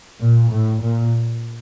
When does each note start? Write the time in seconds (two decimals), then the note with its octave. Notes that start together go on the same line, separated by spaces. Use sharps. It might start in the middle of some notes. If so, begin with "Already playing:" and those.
0.21 A#2
0.51 A2
0.81 A#2